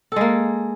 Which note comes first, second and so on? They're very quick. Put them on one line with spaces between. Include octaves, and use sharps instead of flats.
A4 G#3 A#3